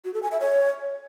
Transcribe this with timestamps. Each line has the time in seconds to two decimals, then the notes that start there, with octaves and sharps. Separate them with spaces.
0.05 F#4
0.14 A4
0.23 G#5
0.32 E5
0.41 C#5